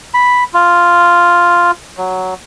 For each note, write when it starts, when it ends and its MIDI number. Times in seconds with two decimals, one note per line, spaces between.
0.14 0.44 83
0.54 1.71 65
1.98 2.34 54